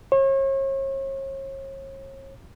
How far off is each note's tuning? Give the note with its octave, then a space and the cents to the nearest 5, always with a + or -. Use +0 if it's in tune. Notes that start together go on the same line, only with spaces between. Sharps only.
C#5 -40